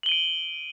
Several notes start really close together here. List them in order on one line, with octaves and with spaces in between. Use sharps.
F#7 G7 D#7 D7